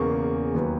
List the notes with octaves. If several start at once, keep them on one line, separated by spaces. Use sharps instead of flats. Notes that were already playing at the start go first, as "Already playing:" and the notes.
Already playing: E1 E2 C#3 E3 A#3 C#6
D#2 D#3 F#3 B3